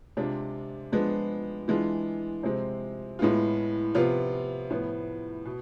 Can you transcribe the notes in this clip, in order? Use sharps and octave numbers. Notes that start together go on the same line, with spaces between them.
C3 G#3 D4 F4
F3 G#3 B3 D4
E3 G#3 D4 F4
C3 F3 G#3 C4
A2 G#3 B3 F4
C3 F3 B3 F4
A2 F3 B3
B2